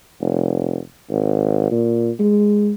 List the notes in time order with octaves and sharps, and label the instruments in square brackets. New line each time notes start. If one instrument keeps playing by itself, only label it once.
[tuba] F1
G#1
A#2
G#3